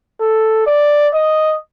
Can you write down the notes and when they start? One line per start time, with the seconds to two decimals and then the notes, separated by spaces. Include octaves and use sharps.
0.20 A4
0.66 D5
1.14 D#5